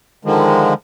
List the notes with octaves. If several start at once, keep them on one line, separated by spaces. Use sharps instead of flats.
D3 D#3 F3 G#3